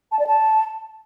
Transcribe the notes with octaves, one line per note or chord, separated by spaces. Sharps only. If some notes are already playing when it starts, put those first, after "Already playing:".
A5
D5
A5